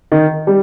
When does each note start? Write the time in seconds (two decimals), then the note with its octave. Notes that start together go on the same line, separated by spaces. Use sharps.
0.12 D#3
0.47 G3